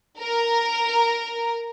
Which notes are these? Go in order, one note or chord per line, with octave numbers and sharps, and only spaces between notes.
A#4